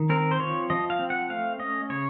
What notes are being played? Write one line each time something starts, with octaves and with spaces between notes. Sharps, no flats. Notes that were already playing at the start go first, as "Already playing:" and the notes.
Already playing: D#3
C4 A#4
C5
F3 C#5
F3 D#5
F5
C4
F#5
A3 F5
C#4 D#5
C#3 C#5